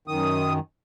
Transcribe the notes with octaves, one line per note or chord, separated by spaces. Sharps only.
F#2 D#3 D#6